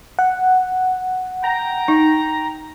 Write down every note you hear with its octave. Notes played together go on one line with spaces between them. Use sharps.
F#5
G5 A#5
D#4